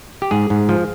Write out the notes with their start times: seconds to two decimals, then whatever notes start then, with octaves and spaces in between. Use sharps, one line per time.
0.22 G4
0.31 G#2 G#4
0.50 G#2
0.69 F3